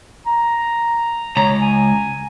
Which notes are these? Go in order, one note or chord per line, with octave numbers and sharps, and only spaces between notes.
A#5
C#2 C#5 A#5
G#5